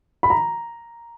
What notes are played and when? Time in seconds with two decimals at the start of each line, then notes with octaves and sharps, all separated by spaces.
0.23 B5
0.30 A#5